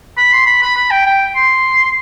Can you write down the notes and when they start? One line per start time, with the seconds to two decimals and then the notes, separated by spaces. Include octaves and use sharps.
0.17 B5
0.33 C6
0.47 B5
0.62 B5
0.76 B5
0.91 G5
1.06 G5
1.36 C6